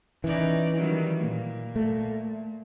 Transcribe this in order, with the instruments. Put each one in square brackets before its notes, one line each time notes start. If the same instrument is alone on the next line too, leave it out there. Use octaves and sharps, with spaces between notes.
[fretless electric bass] E3 [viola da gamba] C#4 D#4 D5
[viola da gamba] D#3 F#3 G3
A#2
[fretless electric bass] A3